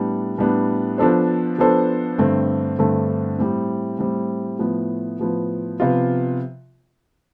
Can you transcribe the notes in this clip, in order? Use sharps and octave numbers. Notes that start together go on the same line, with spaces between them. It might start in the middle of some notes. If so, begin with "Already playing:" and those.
Already playing: A2 G3 B3 D4
A2 G3 B3 D4
F3 B3 D4 A4 C5
F3 B3 D4 A4 C5
G2 D3 A3 C4
G2 D3 A3 C4
A2 G3 C4
A2 G3 C4
A2 F3 B3
A2 F3 B3
C3 F3 B3 F4